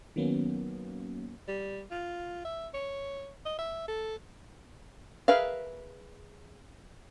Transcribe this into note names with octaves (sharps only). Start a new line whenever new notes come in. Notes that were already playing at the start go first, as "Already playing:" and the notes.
D#3 F#3 A#3 B3 C#4
G3
F4
E5
C#5
D#5
E5
A4
G#4 A#4 B4 E5 F5